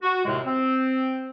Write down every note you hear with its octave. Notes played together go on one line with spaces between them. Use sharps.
F#4
D#2 A2 C3 G#3
C4